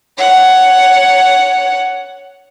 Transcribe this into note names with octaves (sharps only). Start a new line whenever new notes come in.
C#5 F#5